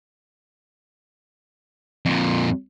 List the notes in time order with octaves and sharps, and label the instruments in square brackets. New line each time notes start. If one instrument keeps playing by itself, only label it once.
[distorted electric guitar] F2 A#2